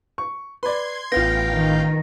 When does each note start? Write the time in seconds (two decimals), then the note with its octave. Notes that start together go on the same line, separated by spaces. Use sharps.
0.18 C#6
0.63 B4 D5 C6 G#6
1.12 A1 B3 F4 F5 G5 A#6
1.51 D#3